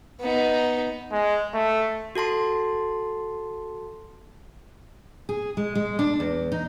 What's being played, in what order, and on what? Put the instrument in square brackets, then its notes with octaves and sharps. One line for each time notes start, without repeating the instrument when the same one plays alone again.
[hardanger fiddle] B3 D#4
[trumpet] G#3
A3
[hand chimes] F#4 A4 A5 C6
[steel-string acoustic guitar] G#4
G#3
G#3
D4
E2
D#4